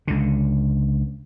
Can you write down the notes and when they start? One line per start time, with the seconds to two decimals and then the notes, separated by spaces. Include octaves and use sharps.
0.08 C#2 D3